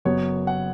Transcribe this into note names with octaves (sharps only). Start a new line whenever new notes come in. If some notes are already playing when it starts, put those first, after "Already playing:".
F#1 F#2 F#3 B3 C#5
F#5